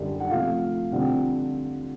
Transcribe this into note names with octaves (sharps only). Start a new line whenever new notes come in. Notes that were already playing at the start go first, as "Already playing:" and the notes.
Already playing: F#2 D3 G3
F#5
C3 F3 A3 F5
F2 D3 G3 C4 F#5